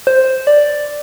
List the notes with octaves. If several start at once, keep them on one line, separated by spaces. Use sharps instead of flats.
C5
D5